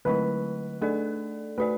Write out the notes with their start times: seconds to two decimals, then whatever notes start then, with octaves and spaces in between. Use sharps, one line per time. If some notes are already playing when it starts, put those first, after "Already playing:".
0.05 D3 F#3 A3 E4 B4
0.82 A3 D4 A4 D5
1.58 A3 F#4 B4 D5